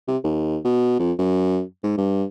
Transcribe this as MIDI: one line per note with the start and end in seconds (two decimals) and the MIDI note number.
0.08 0.17 48
0.24 0.58 39
0.64 0.99 47
0.99 1.13 41
1.19 1.62 42
1.83 1.95 44
1.97 2.24 43